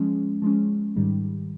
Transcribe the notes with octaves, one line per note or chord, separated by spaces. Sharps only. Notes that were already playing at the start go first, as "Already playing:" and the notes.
Already playing: F3 G#3 C#4
F3 G#3 C#4
G#2 D#3 G3